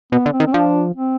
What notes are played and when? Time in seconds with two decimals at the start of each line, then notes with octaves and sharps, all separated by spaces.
0.12 B2 B3
0.26 D3
0.33 C4
0.40 D#3
0.47 C4
0.54 F3 D4
0.96 C4